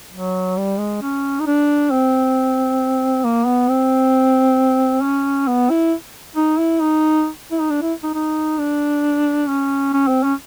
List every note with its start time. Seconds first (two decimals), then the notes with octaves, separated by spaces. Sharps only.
0.12 F#3
0.57 G3
0.79 G#3
1.02 C#4
1.40 D#4
1.47 D4
1.91 C4
3.24 A#3
3.46 B3
3.68 C4
5.02 C#4
5.48 B3
5.70 E4
6.36 D#4
6.58 E4
6.81 D#4
7.52 E4
7.60 D#4
7.70 D4
7.82 E4
8.03 D#4
8.15 D#4
8.59 D4
9.48 C#4
9.94 C#4
10.08 C4
10.23 C#4